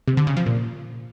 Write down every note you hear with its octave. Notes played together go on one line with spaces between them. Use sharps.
C3
D3
C#3
F3
A#2